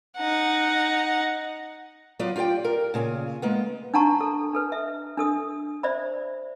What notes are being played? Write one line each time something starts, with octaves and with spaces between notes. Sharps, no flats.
D#4 F#5
F#3 B3 F4 D5 D#5
F4 G4 C#5 D5 G5
A#4
A#2 C#3 G#5
G#3 A#3 B3
D4 D#4 F#5 A5 A#5 C#6
A4
D4 A4 B4
E5
D4 A4 D#6
C5 D5 E5 B5